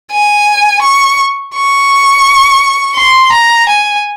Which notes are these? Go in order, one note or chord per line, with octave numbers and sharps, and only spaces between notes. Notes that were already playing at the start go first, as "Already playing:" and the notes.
G#5
C#6
C#6
C6
A#5
G#5